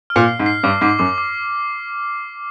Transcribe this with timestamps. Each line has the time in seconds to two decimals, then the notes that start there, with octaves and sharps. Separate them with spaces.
0.10 F6
0.16 A#2
0.28 C7
0.40 G#2
0.46 C7
0.63 G2 D6
0.81 G#2 D6
0.99 F#2 D6
1.18 D6